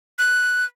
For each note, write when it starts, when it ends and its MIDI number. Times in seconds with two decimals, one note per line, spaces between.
0.19 0.65 90